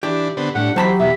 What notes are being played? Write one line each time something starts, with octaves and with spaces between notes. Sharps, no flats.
E3 D4 G4
D3 B3 C4
A2 G3 D4 F#5
E3 F#3 G4 C5 A5 B5
E2 B2 E5